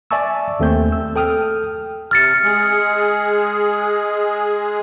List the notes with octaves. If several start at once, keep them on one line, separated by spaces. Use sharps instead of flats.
D5 E5 G#5 A5 C#6 E6
D#2 A3 C4 G6
E6
A4 G5 D#6 F6
C3 F6 A6 C#7
G#3 G#4